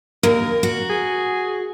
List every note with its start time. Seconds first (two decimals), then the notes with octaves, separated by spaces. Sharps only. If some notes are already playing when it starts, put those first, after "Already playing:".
0.23 D#2 A#4
0.63 F#4
0.90 G#4